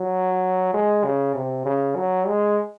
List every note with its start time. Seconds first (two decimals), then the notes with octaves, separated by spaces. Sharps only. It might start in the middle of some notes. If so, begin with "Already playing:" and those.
Already playing: F#3
0.74 G#3
1.04 C#3
1.35 C3
1.65 C#3
1.96 F#3
2.27 G#3